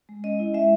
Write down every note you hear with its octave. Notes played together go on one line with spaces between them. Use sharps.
G#3
C#4 D#5
E4
G#3 E5